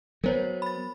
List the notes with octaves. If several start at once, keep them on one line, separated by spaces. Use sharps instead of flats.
F#3 B3 A#4 C5 C#5
B5 A6